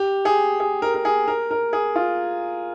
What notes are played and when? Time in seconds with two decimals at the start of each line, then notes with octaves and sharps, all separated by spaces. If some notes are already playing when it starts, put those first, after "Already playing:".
Already playing: G4
0.25 G#4
0.60 G#4
0.82 A#4
0.94 A#4
1.05 G#4
1.28 A#4
1.51 A#4
1.73 G#4
1.96 F4